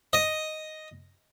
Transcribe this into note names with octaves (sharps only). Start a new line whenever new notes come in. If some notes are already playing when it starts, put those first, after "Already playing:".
D#5